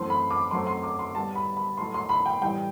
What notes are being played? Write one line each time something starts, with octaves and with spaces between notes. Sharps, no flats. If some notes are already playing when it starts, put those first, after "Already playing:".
Already playing: F#2 E3 A3 C4 C6
B5
D6
F#2 F#3 A3 C4 C6
C6
D6
C6
A2 G3 B3 A5
B5
B5
A2 F#3 A3 C6
C6
B5
G5
A2 E3 G3 G5